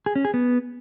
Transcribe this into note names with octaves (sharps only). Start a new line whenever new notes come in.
G#4
C#4
G#4
B3